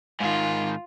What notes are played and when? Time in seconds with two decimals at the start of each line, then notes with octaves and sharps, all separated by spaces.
0.20 G#2 D#3 F4